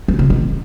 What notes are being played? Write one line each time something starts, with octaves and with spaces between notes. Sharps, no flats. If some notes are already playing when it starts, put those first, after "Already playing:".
F3
A#2
C3
D#3